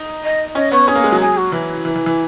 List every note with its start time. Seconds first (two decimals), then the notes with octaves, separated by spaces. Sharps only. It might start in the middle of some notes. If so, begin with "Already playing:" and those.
Already playing: D#4
0.23 D#5
0.55 C#4 D#5
0.72 B3 C#5
0.87 C#4 G#4
0.95 A#3
1.04 G#3
1.12 F#3
1.20 G#4
1.37 F#4
1.52 E3 E4
1.85 E3
1.96 E3
2.06 E3